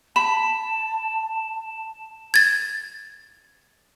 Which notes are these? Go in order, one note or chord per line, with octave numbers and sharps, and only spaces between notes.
A5 B5 E7
G#6 A6